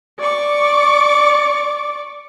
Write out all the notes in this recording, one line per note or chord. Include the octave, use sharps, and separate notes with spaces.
D5 C#6 D6